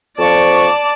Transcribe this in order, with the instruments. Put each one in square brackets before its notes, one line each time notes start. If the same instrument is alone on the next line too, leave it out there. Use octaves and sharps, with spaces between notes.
[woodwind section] F2 F3 C#6 [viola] D5 A5